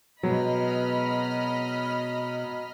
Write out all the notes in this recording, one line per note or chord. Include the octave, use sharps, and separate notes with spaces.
B2 F#3 G#3 D#5 B5 F6